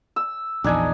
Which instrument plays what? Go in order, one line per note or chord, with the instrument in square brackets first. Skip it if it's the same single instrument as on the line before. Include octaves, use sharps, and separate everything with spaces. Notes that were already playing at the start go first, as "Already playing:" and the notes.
[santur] E6
[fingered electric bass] A#1 E2 [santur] D4 D#4 G#5